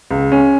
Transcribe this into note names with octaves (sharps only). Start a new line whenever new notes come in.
C#2
C#4